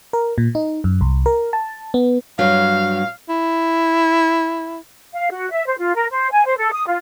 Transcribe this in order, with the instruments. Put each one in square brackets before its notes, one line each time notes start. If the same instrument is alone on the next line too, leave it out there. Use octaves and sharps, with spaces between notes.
[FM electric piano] A#4
A#2
D#4
F#2
C2
A#4
A5
B3
[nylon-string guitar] G2 F#3 [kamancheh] F5
[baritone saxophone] E4
[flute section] F5
F#4
E5
C5
F4
A#4
C5
G#5
C5
A4
D#6
F4